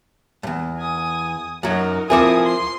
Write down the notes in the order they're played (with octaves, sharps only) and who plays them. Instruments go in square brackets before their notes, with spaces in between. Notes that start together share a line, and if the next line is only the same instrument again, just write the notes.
[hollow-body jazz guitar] E2 G2
[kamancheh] G#5 D#6
[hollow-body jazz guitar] F#2 F#3 [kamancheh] D#4 A#4
[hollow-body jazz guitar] F3 C4 G#4 [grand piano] E4 A#4 D6 [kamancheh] G#5 D#6
[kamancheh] C6